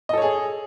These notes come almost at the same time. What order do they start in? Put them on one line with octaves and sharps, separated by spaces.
D#5 A4 C#5 G#4